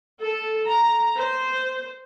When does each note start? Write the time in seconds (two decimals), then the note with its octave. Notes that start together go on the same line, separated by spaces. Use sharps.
0.20 A4
0.68 A#5
1.16 C5